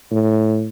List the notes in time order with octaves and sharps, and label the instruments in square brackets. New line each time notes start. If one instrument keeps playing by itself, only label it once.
[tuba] A2